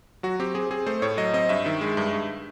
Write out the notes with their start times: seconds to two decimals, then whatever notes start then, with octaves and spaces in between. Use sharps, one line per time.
0.23 F#3 F#4
0.40 C4 G4
0.55 C4 G#4
0.71 C4 G#4
0.86 A3 C5
1.02 A2 C#5
1.17 F#3 D#5
1.33 C4 D#5
1.49 G2 E5
1.66 D#3
1.81 G#3
1.97 G2
2.13 G2